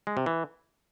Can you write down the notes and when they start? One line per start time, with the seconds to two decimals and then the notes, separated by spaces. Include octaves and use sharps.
0.07 G#3
0.17 C3
0.26 E3